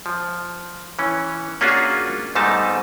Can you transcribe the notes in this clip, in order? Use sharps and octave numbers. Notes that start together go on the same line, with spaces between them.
F3
E3 C#4
A#3 C#4 D4 F4 F#4 G#4
G#2 G3 A3 B3 D#4 A5